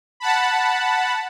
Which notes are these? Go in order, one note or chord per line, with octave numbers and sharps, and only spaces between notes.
F#5 A5 B5